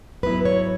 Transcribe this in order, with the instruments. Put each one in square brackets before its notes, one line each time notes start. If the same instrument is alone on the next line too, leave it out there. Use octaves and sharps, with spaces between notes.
[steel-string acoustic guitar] G#2 F#3 B3 E4 B4
C#5